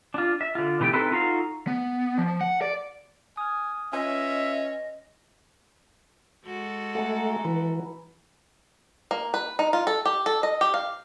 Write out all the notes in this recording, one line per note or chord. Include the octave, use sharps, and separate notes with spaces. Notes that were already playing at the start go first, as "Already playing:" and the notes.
D4 F4
E5
D3 F4
B2 E3 A3 G4 G5
C4 D#4 E4 A4 B4
D#4 F4 F#4 A4 F5
B3
F3
F#5
D5
G#5 D#6 F6
C#4 F4 B4 D#5 E5 G#5
G#3 F#4 A4
A3 F#5 G#5 A#5
E3 B4
A#3
B4
D#4
F4
A4
G4
A4
D#5
G4
F5